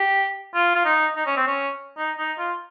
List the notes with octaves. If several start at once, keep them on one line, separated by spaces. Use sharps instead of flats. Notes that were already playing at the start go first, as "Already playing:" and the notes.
Already playing: G4
F4
F4
D#4
D#4
C#4
C4
C#4
D#4
D#4
F4